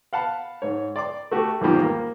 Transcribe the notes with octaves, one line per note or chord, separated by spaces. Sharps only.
F5 F#5 A5 B5
G#2 C#5
D5 C6 D6
A3 F#4 G4
E2 G#2 D#3 F3 G3 A#3
A#3